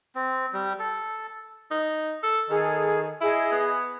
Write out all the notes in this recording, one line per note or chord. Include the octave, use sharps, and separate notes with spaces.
C4
G3
A4
D#4
A4
D#3 G#4 A4
E4 G#4 D#5
B3